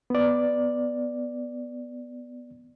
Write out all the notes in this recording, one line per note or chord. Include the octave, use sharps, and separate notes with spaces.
B3 D5